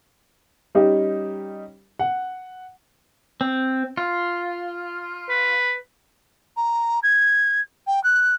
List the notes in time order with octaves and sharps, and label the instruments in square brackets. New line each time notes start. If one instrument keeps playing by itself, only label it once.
[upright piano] G3 C#4 D#4 G4
F#5
[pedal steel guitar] C4
F4
[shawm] B4
[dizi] A#5
G#6
G5
F#6